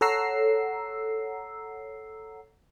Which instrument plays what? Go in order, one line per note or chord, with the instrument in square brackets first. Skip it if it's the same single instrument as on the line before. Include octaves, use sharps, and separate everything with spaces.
[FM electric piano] A4 C#5 F#5 A#5 E6 C7